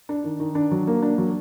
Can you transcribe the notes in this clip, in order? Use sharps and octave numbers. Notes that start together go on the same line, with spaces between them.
D4
D#3
D#3
D4
F#3
A#3
D4
F#3